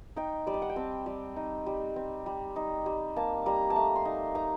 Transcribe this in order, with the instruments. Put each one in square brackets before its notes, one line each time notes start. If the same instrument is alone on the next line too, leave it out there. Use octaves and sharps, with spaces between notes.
[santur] D#4 G5
G3 D5
D#5
F#5
G5
C4 A5
G3
D#4
G3
C4
G3
D#4
G3
A#3 A5
G3 A#5
A5
A3 A#5
C6
D#4
D#4 A#5